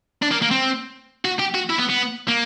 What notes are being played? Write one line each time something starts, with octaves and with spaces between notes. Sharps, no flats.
D4
A#3
A#3
C4
F#4
G4
F#4
E4
B3
B3
A#3